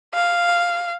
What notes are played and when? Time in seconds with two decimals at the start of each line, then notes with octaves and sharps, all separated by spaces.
0.14 F5